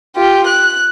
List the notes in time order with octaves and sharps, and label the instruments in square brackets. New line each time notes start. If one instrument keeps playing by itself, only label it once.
[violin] F4 G4
F#6